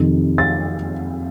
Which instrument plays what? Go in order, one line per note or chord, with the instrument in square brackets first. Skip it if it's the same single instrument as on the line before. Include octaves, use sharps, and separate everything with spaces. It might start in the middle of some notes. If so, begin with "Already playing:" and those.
Already playing: [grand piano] F2 C3 D#3
A6